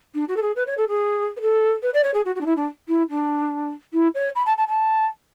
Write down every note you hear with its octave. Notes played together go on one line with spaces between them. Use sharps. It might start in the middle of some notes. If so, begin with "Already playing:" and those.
D4
F#4
A4
G#4
B4
C#5
A4
G#4
B4
A4
B4
D5
C#5
G#4
F#4
F#4
D4
E4
D4
E4
D4
E4
C#5
B5
A5
A5
A5